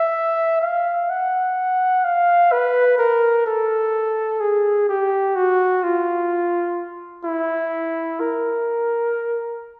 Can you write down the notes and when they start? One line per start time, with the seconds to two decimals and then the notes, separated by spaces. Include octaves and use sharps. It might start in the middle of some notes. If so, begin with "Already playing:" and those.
Already playing: E5
0.62 F5
1.10 F#5
2.04 F5
2.52 B4
2.98 A#4
3.46 A4
4.40 G#4
4.89 G4
5.36 F#4
5.83 F4
7.24 E4
8.20 A#4